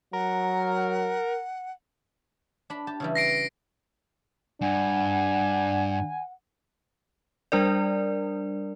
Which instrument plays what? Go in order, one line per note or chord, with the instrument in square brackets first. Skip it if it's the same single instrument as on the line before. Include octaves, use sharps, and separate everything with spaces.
[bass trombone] F#3 [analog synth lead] A#4 [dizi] F#5
[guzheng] D4 B5
G4 A5
C#3 E3 G3
[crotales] A#6 C7 D7
[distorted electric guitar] G2 [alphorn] D4 [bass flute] F#5 [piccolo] G#5
[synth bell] G3 D4 A#4 D5